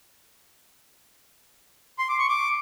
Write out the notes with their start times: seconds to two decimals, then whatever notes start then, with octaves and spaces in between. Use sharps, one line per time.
1.99 C6
2.09 D6
2.19 C#6
2.29 D6